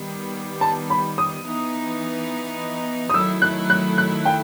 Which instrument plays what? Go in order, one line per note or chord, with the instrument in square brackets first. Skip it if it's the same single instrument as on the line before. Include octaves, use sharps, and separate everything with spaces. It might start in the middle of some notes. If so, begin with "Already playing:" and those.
Already playing: [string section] D#3 G3 B3
[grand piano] A5
B5
D#6
[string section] E3 B3 D#4
[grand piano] D#6
[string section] D#3 F#3 A3 E4 [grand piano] E6
[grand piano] F#6
F#6
F#6
G5